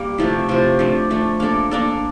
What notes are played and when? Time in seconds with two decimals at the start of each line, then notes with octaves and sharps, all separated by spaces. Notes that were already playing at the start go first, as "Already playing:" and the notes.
Already playing: G3 A#3
0.18 C3 F3 A3 E4
0.49 C3 F3 A3 E4
0.79 F3 A3 D4
1.10 F3 A3 D4
1.40 A#3 D4 A4
1.71 A#3 D4 A4